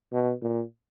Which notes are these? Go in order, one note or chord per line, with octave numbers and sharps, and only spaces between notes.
B2
A#2